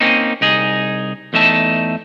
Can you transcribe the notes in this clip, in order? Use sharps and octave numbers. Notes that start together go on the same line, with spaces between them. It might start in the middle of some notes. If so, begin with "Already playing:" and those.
A#3 C4 C#4 D#4
C2 D#4 G#4
E2 A3 D#4 E5 A5